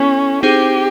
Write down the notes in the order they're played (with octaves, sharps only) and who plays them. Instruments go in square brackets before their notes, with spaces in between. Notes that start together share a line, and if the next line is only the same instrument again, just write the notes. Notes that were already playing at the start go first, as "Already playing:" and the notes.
Already playing: [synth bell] B3 E4 A4 [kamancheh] C#4
[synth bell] C4 D#4 G#4 C5 [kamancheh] G4